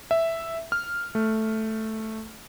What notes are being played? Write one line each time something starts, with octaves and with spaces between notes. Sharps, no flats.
E5
F6
A3